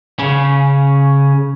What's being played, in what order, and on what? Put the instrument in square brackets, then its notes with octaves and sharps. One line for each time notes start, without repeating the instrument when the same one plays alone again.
[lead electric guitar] C#3 C#4